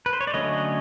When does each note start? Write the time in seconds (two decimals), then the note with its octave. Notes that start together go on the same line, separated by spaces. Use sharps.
0.06 B4
0.13 C5
0.21 C#5
0.27 D5
0.34 D3 F#3 A3 C#4 C#5 D#5